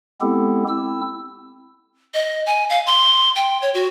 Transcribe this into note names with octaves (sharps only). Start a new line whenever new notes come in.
G#3 B3 C4 E4 G4 A4
C4 E4 E6
D#5
G#5
F5
C6
G5
C#5
F#4